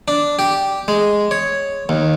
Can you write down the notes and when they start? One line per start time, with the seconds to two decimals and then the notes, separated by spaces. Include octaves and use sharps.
0.08 D4
0.39 G4
0.88 G#3
1.31 C#5
1.89 D#2